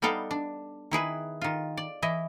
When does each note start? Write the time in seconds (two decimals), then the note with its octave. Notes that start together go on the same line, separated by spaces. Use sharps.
0.02 G3 B3 D#4 A4 F5 G5
0.31 D4
0.91 D#3 E4 G#4 B4
1.41 D#3 F4
1.77 D5
2.02 E3 E4 D#5